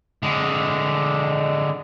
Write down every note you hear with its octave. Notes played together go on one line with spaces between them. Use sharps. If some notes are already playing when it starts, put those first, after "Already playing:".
D3 G#3